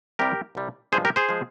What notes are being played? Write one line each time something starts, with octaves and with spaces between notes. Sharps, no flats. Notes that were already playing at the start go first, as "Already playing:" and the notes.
C2 C3 G3 G4 A#4
C2 C3 G3
G2 F3 G#3 G#4 C5
G4 A#4
G#4 C5
F3 G#3